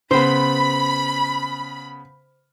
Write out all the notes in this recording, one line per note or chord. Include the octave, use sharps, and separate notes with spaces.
C#3 B3 C5 B5